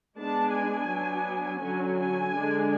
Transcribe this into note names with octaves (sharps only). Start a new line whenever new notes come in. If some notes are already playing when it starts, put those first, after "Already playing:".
G#3 B3 D4 A5
G#5
F#3 B3 D4
D3 F#3 C#4 G#5
G#5
D3 G#3 D4